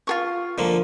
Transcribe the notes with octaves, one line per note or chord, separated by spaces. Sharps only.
F4 G#4 C#6
D3 F3 A#3